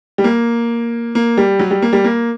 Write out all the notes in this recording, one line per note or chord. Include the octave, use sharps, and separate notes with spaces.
G3
A#3
A#3
G3
F#3
G3
A#3
G3
A#3